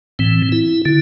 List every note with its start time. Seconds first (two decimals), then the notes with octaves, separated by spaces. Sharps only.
0.19 A2 E3 C4
0.52 E4
0.85 D3 E4